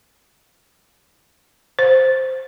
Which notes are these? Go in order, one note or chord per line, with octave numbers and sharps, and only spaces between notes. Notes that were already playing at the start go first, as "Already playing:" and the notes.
C5